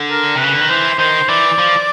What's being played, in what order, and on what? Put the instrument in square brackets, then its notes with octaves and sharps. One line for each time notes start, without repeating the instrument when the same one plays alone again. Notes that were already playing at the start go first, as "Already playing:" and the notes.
Already playing: [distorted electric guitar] D3
[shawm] A#4
[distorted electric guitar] C3
[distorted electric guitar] C#3 [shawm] B4
[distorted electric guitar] D3
D#3
[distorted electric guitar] E3 [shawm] C5
[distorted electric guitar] D#3 [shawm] C5
[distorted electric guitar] E3 [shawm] D5
[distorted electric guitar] F3